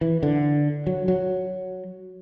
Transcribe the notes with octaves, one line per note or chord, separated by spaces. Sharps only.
E3
D3
F#3
F#3